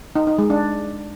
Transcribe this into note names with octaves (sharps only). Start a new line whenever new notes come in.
D#4
D#4
G#3
D4